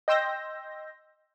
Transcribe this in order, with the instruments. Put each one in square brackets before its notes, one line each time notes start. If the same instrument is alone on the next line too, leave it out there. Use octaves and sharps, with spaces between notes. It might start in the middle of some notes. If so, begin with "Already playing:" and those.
[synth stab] D#5 G5 C6 E6 G6 A#6